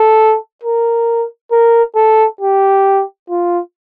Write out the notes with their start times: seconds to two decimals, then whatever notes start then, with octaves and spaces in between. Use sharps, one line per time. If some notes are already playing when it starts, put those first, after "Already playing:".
Already playing: A4
0.63 A#4
1.52 A#4
1.96 A4
2.41 G4
3.29 F4